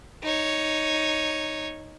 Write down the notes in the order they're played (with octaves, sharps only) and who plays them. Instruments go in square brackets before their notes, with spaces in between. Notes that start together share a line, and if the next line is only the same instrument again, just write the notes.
[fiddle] D#4 C#5